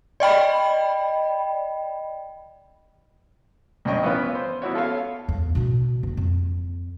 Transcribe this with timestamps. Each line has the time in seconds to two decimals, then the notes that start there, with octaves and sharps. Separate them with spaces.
0.20 D5 D#5 G5 B5
3.85 C2 F#2 D4 D#5 G5 C#6
4.03 E3 B3 F4 B4 C#5
4.35 C5
4.62 B3 E4 F#4 C#5
4.74 F4 A4 C#5 F5
5.29 E2
5.55 B2 E4
6.03 D#1 F#2
6.17 F2